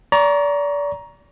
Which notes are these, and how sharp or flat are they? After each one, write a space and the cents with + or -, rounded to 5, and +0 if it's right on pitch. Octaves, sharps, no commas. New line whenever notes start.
D5 -30 A#5 +15 C#6 +0